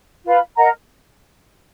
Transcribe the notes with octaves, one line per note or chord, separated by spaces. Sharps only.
F4 B4 F5 B5
A#4 D#5 F#5 A#5